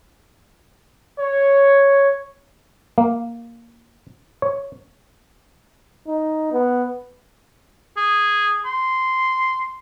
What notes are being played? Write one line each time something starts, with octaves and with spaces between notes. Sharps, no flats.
C#5
A#3
C#5
D#4
B3
G#4
C6